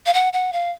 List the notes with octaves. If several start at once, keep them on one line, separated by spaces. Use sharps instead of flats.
F5
F#5
F#5
F5